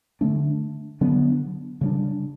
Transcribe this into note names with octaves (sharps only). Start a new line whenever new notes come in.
D3 A3 D4
D3 F#3 B3 D4
C#3 G3 D4